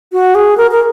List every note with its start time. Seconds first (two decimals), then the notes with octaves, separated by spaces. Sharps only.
0.12 F#4
0.35 G#4
0.57 A#4
0.71 A#4